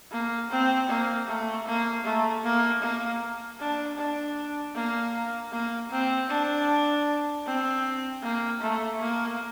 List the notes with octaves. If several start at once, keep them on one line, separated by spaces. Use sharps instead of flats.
A#3
C4
A#3
A3
A#3
A3
A#3
A#3
D4
D4
A#3
A#3
C4
D4
C4
A#3
A3
A#3